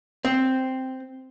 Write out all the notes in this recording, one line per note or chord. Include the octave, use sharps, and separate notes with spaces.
C4